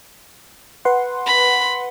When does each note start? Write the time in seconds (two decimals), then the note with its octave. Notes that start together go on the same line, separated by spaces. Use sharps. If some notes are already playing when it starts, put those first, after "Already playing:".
0.85 B4 F#5 C6
1.25 B5